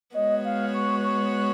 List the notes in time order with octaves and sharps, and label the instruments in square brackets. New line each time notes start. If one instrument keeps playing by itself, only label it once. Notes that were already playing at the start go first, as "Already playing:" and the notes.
[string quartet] G#3 B3 F#4 C#5 [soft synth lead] D#5
[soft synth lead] F5
C#6
C#6